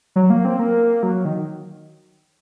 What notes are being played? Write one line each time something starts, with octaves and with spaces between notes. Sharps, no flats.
F#3
A#3
C4
A#3
F#3
D#3